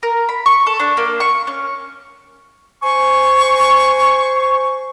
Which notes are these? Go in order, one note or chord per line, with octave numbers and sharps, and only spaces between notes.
A#4
B5
C#6
A4
D4
A#3
C#6
C#4
C5 G#5 C#6